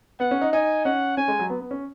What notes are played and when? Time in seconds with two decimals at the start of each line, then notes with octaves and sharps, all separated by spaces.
0.20 B3 F#5
0.31 C#4
0.41 D#4
0.53 D#4 G#5
0.85 C#4 F#5
1.17 C#4 G#5
1.28 G#3
1.39 F#3
1.50 B3
1.61 B3
1.71 C#4